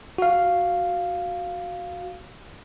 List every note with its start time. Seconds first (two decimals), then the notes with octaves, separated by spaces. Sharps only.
0.18 F#4 F5